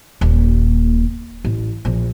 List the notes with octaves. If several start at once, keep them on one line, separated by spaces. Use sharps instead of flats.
D#1 A#2
A1
A#1